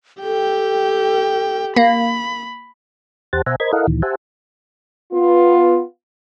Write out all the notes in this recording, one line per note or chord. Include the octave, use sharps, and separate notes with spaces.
G4 A4 G5
A#3 B5
E2 G4 C5 F#5 A5 A6
B2 C5 E5 F#5 G#5 A#5
A#4 C5 D#5 B5 G#6
E4 A4 A#4 D#5 F5 F#5
D2 A#2 D#3 E3
G4 C5 E5 F#5 G#5 A5
B3 F4